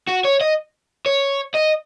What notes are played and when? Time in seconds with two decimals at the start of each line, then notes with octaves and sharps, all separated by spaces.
0.08 F#4
0.25 C#5
0.41 D#5
1.06 C#5
1.54 D#5